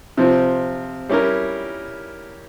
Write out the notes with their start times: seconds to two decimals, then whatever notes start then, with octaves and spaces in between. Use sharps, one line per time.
0.17 C3 F3 C4
1.09 G3 C#4 E4 G4 A#4